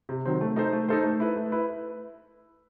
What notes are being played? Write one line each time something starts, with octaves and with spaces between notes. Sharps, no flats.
C3
D#3 F#3 C4
A3
D#4 A4 C5
A3
D#4 A4 C5
A3
E4 B4
A3
E4 B4